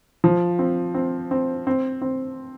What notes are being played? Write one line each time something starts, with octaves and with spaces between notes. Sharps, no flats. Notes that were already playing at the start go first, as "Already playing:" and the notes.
F3
C4
C4
C4
C4
C4